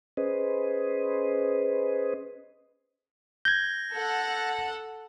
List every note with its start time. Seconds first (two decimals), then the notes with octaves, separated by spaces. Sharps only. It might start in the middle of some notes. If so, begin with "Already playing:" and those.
0.17 C#4 G#4 B4 C5 D#5
3.45 G6 G#6 A#6
3.94 A4 F#5